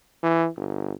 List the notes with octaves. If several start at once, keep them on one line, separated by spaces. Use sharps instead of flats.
E3
G1